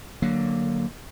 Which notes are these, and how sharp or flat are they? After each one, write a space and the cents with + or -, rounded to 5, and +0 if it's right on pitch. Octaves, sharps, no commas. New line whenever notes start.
D3 +15 F#3 +0 A#3 +0